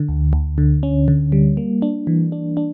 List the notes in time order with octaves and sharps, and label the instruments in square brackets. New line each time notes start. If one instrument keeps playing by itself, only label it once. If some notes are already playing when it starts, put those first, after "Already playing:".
Already playing: [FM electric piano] D3
D2
D2
D3
C#4
D3
G3
A#3
D4
E3
D4
D4